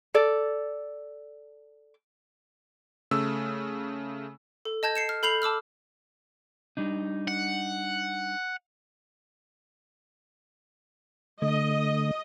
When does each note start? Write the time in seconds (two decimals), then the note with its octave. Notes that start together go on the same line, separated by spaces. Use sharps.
0.14 A4 D5
3.11 C#3 A3 E6
4.65 A4
4.83 D#5 A5 G6 G#6
4.95 C7 C#7 E7
5.09 F6
5.23 A4 B5 G6 C7 F7 F#7
5.42 A5 D6 E6 F6
6.77 G3 D4 D#4
7.28 F#5
11.42 D3 A3 D#5